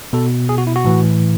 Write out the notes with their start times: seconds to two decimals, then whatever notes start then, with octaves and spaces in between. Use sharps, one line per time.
0.13 B2 A4
0.49 G#4
0.58 F#4
0.67 E4
0.76 F#4
0.85 A2 E3